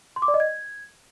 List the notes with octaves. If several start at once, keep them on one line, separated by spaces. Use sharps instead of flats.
C6
D6
D5
D#5
G#6